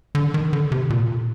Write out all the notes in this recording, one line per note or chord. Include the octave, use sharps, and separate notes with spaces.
D3
D#3
D3
C3
A#2